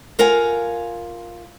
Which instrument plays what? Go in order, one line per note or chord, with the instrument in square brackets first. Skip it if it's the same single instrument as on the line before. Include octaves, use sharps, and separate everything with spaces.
[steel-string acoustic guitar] F4 A#4 F5 F#5 G#5